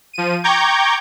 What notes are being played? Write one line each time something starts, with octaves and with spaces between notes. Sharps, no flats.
F3 D#7
G5 A#5 C#6 D6 G6 G#6